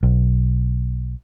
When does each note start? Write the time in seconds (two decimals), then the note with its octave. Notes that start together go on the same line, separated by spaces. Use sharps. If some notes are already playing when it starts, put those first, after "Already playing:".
0.03 B1